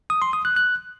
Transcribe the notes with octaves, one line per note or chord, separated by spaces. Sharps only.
D#6
C6
D#6
F#6
F#6